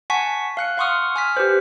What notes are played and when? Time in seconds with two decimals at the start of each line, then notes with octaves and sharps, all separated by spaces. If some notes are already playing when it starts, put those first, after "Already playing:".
0.10 F#5 G#5 A5 C#6 B6
0.57 F5 F#6 C#7
0.77 F5 F#5 C6 C#6 D#6 F6
1.16 G#5 F6 B6
1.37 G4 B4 C5